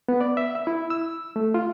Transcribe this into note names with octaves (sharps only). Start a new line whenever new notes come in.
B3
D5
E5
E5
E4
E6
A3
F4